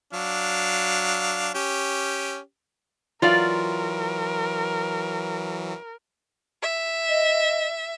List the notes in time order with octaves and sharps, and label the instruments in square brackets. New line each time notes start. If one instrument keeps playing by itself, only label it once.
[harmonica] F#3 D4 F5
C#4 G4
[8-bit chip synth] E3 F#3 [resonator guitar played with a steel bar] F4 D5 F5 [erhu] A#4
[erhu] E5
[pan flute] D#5